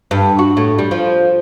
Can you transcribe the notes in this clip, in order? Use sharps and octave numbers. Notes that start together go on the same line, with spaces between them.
G2
F#4
A2
G3
F3